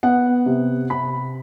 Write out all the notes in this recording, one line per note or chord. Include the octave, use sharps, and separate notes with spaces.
B3 F#5
C3
C3 B5